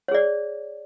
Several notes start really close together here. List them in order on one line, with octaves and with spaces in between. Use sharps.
C#5 G#4 D5